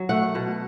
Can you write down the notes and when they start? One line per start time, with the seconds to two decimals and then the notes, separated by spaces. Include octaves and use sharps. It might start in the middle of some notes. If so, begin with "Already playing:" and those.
Already playing: F#3
0.09 A3 F#5
0.35 B2